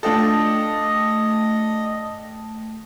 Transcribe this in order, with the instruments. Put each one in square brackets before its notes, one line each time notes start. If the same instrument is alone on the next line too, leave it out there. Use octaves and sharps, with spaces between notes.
[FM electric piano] A3 G5 A5 [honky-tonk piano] D4 F4 A4 [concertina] D#5